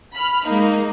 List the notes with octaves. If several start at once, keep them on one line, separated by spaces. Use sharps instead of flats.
B5 F6
G#3 A#3 D#4